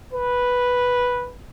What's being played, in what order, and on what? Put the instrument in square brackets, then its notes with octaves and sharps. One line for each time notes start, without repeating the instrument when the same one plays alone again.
[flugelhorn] B4